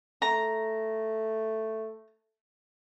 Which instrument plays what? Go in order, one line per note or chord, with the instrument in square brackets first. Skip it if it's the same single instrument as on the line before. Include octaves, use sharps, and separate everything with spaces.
[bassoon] A3 [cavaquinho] A#5